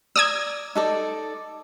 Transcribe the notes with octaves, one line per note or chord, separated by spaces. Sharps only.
D5 A#5 D#6 E6 G#6
D#4 A4 D5